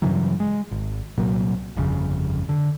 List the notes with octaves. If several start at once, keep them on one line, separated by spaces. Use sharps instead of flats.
G2 C#3 E3 F#3
G#3
G#1
C2 A#2 F#3 A#3
G1 F2 C#3
D3